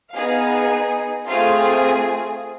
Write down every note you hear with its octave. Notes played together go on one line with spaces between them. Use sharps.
B3 D#4 G#4 F5
A3 C4 F4 G#4 F5